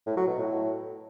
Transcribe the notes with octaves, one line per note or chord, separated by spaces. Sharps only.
A2
F#3
B2
A2